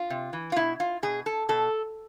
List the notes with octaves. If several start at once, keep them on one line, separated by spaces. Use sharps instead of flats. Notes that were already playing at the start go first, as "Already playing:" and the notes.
Already playing: F4
C3
E3
F4
B2 E4
F4
B2 G#4
A4
B2 A4